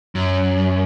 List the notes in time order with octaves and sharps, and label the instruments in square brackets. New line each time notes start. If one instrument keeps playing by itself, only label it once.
[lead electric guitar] F#2